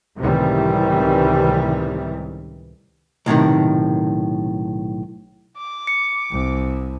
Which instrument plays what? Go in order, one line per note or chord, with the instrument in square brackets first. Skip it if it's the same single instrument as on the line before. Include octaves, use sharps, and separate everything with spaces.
[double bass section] C#2 A2 C3 D#3 E3 G3
[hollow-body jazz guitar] B1 A2 C3 D#3
[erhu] D6
[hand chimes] C#7
[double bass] C2